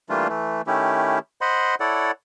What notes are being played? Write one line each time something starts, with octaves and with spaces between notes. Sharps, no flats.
E3 G3 A3 A#3 D4 F4
E3 A3
D#3 A3 C#4 E4 G4
C5 D#5 F#5 B5 C6
E4 A4 C#5 D5 F#5